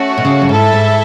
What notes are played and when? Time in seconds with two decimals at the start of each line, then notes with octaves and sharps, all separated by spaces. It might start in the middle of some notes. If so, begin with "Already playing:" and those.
Already playing: A3 C#4 F#4
0.18 B2
0.25 C#3
0.42 F#2
0.49 G#2 E4 A4 E5
0.73 G#2